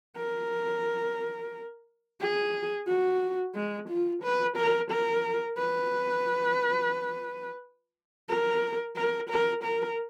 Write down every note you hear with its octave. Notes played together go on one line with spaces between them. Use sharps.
A#4
G#4
F#4
G#3
F4
B4
A#4
A#4
B4
A#4
A#4
A#4
A#4